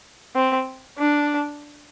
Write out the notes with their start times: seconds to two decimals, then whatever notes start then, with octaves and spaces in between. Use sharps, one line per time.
0.35 C4
0.98 D4